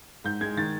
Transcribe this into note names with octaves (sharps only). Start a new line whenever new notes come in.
G#2 G6
G#3 G#6
D#3 A6